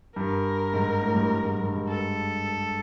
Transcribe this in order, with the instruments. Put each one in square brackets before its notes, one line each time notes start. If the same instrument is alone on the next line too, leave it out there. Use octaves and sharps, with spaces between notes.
[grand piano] G2 [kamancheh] A#4
[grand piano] G#2
A2
G2
G#2
G2
G#2
G2
G#2
[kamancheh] A4